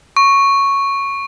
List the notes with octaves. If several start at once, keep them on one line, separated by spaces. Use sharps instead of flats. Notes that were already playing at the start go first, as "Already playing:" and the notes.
C#6